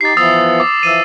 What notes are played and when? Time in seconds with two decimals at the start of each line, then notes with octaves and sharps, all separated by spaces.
0.01 D#4 G4 A6 C7
0.17 E3 F3 B3 D#6 E6 A6
0.60 D6
0.83 E3 F3 E6 D#7